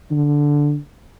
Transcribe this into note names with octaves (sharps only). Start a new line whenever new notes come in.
D3